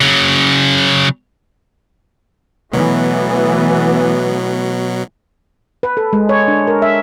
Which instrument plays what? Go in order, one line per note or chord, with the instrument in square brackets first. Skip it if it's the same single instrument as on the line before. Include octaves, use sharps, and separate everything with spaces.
[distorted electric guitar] C#3 F#3
[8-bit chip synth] B2 F#3 [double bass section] E3 A3 B3
[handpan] B4
A4
G#3
C#5
D4
A#4
E5